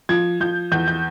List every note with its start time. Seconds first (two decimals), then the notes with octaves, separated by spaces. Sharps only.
0.09 F3 G#6
0.40 F3 G6
0.72 E2 G6
0.88 G6